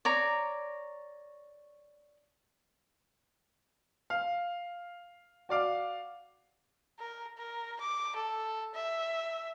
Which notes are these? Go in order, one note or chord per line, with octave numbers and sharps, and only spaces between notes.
C#5 D5 A#5
F5
F#4 D5 F5 D6
A#4
A#4
D6
A4
E5